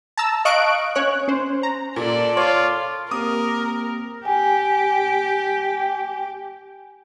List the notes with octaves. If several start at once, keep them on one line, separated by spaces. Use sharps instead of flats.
A5 A#5 E6
D#5 F5 C#6 F#6 D7
C#4 C#5 F#6
C#4 C5
A#5
A#2 A4 D5
F4 C#5 D6
A#3 C4 G4 A#4 D6 D#6
G4 G#5